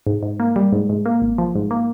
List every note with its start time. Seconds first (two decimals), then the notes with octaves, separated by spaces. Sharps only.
0.07 G#2
0.23 G#2
0.40 A#3
0.56 G3
0.72 G#2
0.90 G#2
1.06 A#3
1.22 G#1
1.38 F3
1.55 G#2
1.71 A#3